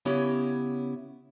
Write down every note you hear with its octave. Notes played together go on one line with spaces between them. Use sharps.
C#3 B3 C#4 E4 G4 C#5